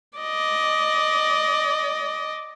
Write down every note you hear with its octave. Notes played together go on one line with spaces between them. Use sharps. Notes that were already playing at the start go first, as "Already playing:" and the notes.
D5 D#5